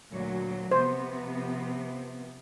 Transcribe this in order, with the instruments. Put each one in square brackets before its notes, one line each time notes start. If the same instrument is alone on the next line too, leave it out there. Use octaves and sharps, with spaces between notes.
[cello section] D2 A#2 F#3
[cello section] C3 F3 B3 [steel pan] C5